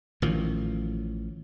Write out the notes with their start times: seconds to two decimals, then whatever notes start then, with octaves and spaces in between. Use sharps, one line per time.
0.22 A1 D#3 F3